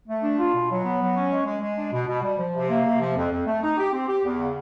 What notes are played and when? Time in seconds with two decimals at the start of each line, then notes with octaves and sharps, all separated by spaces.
0.08 A3
0.23 D4
0.38 F4
0.53 B2
0.69 F#3
0.85 B3
1.00 F#3
1.16 C#4
1.32 G#3
1.46 G#3
1.61 G#3
1.77 D4
1.93 B2
2.08 B2
2.23 G3
2.38 F3
2.55 C3
2.70 A#3
2.85 C3
3.00 F3
3.16 F2
3.31 F2
3.47 A3
3.62 D#4
3.78 G4
3.93 C4
4.09 G4
4.24 E2
4.39 C#3